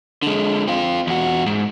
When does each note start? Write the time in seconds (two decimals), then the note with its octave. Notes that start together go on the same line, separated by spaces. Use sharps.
0.22 D3 G#3
0.68 C4 F4
1.07 E2 F#4
1.46 G#2